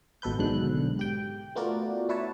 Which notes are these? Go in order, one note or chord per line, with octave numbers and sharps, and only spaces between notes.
G#1 B2 A4 B4 G6
B1 G#2 B2 D3 F#6
G4 G5
A3 B3 F4 F#4 A#4 D5
D4 E4 B4 C#5 A5